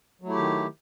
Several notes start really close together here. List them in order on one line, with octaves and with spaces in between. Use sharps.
F#3 A3 E4 G4 D#3